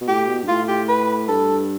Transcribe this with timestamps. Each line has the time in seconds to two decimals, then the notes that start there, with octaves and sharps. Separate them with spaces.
0.01 B2
0.08 A2 G4
0.27 B2
0.43 G2
0.47 A2 F4
0.68 G4
0.89 B4
1.28 G2 A4